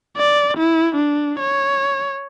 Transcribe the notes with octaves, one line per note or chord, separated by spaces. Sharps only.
D5
E4
D4
C#5